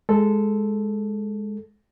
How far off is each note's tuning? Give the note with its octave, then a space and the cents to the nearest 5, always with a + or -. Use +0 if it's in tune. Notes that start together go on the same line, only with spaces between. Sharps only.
G#3 +0 A4 +0